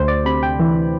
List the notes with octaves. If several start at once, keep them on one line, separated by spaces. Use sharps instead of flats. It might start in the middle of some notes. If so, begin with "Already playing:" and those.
Already playing: D2 C5
D5
C3 B5
G5
E3